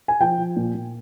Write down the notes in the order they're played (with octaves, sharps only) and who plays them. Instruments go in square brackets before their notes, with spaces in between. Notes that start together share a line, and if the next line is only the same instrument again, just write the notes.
[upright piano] G#5
F3 G5
F3
A#2
A#2